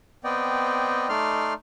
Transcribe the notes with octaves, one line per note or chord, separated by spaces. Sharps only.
B3 C4 D5 D#5 G5
A3 D#4 D5 C6 F6